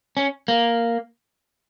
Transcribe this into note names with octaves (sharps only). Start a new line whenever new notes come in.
C#4
A#3